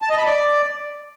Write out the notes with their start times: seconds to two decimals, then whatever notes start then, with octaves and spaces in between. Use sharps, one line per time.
0.02 A5
0.10 D#5
0.18 B5
0.26 D5